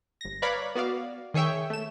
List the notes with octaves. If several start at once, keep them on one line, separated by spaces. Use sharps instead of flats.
G1 A#6
B4 C#5 D5 F5 A#5 B5
B3 F#4 D5 F5
D#3 G#4 C#5 E5 G5
A3 E7